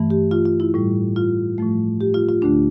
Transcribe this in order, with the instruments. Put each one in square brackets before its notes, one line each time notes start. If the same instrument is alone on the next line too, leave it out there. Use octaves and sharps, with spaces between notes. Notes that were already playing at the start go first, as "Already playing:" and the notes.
Already playing: [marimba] G2 E3 A3
G4
F4
F4
E4
A2 G3
F4
A2 F3 A3
G4
F4
F4
D2 D3 A3 D4